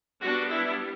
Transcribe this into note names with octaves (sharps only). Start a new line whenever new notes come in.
G3 B3 D4 F#4
E4